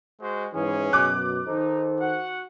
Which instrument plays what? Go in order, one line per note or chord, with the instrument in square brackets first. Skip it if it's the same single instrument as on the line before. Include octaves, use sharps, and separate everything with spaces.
[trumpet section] G#3 F#4 C5
[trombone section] G#2 E3 [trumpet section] C#4 G#4
[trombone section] F#2 B2 [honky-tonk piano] D6 F#6
[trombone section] D#3 A4 C5 [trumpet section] D#4
[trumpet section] F#4 F#5